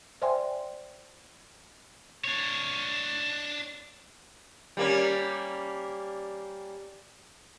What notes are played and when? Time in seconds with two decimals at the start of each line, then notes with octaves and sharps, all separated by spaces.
0.22 C5 D5 E5 G5 G#5 C6
2.24 D4 C#5
4.77 G3 A#3 C#4